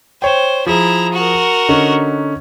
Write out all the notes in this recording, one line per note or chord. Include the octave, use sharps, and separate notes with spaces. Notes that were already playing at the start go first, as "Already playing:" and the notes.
C5 C#5 G5
F3 E4 G#4 A#5
F#4 A#4
D3 C#4 D#4